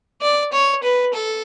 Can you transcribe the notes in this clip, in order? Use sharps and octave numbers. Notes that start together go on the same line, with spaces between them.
D5
C#5
B4
A4